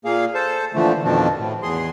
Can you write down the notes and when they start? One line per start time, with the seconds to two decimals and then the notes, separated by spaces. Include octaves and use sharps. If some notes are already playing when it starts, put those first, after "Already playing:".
0.05 A#2 A#3 G#4 F5
0.35 A4 C5 A5
0.74 A#2 D3 E3 F3 A3 C4
1.04 F2 B2 D#3 F3 C4 D4
1.38 A2
1.63 E2 G#4 C6